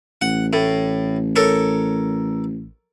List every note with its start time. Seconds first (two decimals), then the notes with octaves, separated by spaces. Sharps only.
0.21 A1 F#5
0.53 A2
1.36 A4 A#4 C#5